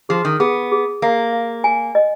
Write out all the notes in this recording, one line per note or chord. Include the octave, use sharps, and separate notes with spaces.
F3 G#4
D#3
B3 G#4
G#4
A#3 F5
F5
G#5
D#5